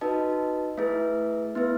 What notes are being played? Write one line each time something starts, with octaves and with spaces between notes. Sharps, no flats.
D#4 F#4 B4 D#5 A5
A3 E4 G#4 B4 E5
B3 E4 B4 E5